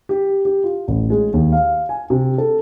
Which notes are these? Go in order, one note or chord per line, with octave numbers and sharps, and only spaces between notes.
G4
G4
F4
A1
G#3
D#2
F5
G#5
C3
A4